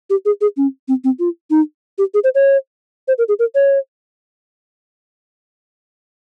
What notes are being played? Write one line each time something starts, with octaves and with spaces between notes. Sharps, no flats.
G4
G#4
G#4
C#4
C4
C4
F4
D#4
G4
G#4
C5
C#5
C5
A#4
G#4
A#4
C#5